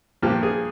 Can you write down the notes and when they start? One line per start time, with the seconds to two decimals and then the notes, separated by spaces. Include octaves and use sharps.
0.22 G2 F3 A#3 G4
0.43 G#4